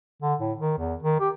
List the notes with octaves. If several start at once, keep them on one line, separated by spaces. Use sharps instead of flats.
D3
A2
D#3
E2
D#3
G4